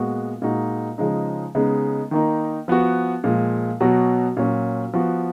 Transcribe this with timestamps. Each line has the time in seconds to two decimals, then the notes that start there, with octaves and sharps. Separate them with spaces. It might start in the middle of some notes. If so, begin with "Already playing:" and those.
Already playing: A#2 G#3 B3 F#4
0.42 A#2 G#3 D#4 F#4
0.98 C#3 F3 G#3 D#4
1.55 C#3 G#3 B3 D#4
2.11 D#3 A#3 D#4
2.68 F3 B3 F#4
3.24 A#2 F3 G#3
3.80 B2 F#3 B3 F#4
4.37 A#2 F#3 C#4
4.93 F3 B3 F#4